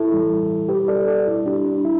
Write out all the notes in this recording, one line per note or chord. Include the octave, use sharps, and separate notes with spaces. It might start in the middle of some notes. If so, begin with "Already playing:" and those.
Already playing: E4 A4
A2 E3 G3
B2 G3 G4 B4
A4 D5
A4 D5
B2 G3 E4
D4 G4
D4
G3 E4